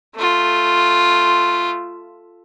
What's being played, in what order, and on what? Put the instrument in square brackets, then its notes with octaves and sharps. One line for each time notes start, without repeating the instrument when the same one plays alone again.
[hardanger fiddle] A3 F4